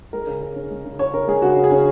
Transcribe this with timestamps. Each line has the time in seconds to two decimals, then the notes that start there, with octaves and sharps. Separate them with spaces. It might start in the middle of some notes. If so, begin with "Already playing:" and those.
0.13 G#3 A#4
0.27 C#3
0.42 C#3
0.56 C#4
0.70 G#3
0.85 C#3
0.99 C#3 C#5
1.13 C#4 A#4
1.28 G#3 G#4
1.42 C#3 F#4
1.57 C#3
1.64 G#4
1.71 C#4